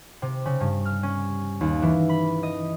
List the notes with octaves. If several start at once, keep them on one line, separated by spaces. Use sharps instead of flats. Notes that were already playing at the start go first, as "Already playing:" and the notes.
C3
C#3
G2
F6
C#4
D#2
E3
B5
D#5